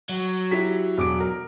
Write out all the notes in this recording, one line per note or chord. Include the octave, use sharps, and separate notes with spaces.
F#3
E4 G4 B6
E1 D6 D7
A#4